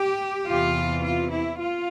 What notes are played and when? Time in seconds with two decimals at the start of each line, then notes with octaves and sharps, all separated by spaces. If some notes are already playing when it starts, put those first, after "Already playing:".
Already playing: G4
0.47 E2 C3 E3 F4
1.04 F4
1.31 E4
1.60 F4